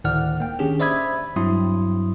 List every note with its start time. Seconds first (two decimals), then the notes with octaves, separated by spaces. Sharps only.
0.04 D2 A2 D#3 D5 F#5 F6
0.40 A#3 G5
0.59 D#3 C#4 D4 G4 G#4
0.80 C5 D5 E5 B5 D#6 G#6
1.36 G2 F#3 C4 E4 C6 D#6